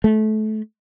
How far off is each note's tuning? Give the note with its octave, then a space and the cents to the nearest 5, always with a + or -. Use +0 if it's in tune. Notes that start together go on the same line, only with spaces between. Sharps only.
A3 -25